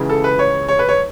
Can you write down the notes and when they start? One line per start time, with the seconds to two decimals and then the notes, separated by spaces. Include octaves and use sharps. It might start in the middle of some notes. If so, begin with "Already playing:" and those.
Already playing: C#2 C#3 E3
0.10 A4
0.24 B4
0.39 C#5
0.69 C#5
0.79 B4
0.89 C#5